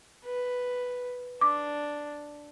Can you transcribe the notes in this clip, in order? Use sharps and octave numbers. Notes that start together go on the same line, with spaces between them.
B4
D4 D6